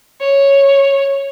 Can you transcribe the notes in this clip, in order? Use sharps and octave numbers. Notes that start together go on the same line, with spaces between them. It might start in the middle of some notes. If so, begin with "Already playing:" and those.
C#5